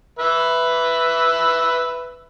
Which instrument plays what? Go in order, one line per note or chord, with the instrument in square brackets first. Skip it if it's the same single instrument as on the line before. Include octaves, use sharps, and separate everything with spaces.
[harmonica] B4 E5